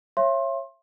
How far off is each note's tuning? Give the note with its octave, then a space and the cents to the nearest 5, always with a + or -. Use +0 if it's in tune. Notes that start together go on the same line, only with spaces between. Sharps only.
C#5 -25 E5 +35 C6 +25